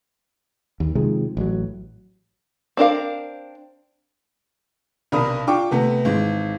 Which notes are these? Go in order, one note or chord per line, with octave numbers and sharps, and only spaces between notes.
D#2
C3 D#3 F3 G#3
A1 F#3
C4 D4 A#4 F5
B1 C3 D4 A#4 B5 D#6
D4 F4 G5 C#6 D6
C3 A3 B3
G#1 E3 G#3